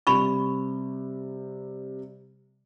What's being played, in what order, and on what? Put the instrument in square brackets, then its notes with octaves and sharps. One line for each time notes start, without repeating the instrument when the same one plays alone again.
[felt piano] C3 G3 [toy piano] B5 C#6